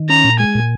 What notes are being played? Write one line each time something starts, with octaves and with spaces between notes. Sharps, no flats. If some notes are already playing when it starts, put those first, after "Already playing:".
Already playing: D#3
C#4 A#5
A#2
G#3 G#5
A#2